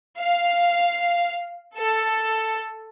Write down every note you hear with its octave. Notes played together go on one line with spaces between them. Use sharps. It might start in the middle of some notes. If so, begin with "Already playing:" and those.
F5
A4